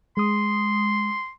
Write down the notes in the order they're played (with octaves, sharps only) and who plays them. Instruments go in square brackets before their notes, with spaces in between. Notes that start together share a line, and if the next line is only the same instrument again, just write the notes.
[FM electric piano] G#3 D#6 [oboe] C6